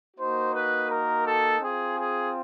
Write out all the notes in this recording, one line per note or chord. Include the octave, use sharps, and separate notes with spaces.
A#3 D#4 F#4 C5
B4
A#4
A4
C4 F4 G#4
G#4